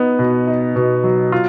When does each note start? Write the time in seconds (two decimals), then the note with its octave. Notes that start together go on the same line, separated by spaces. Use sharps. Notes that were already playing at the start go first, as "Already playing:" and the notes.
Already playing: B3 D#4
0.19 B2
0.47 D#4
0.76 B2
1.04 F#3
1.32 F4